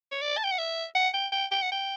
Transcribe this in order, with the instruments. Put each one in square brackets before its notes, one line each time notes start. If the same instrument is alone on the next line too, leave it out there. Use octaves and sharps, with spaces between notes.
[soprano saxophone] C#5
D5
A5
G5
F#5
E5
F#5
G5
G5
G5
F#5
G5